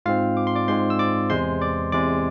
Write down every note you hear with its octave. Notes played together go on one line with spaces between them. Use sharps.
G#2 G#3 C4 F4 F5
D6
C6
D5 D6
G#2 G#3 C4 C5 C6
E6
D5 D6
E2 C3 G#3 C5 C6
D5 D6
E2 C3 G#3 D5 D6